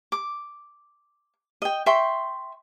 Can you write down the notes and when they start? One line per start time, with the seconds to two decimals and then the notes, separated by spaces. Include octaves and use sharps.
0.12 D6
1.62 D#5 G5
1.86 E5 G5 C6 C#6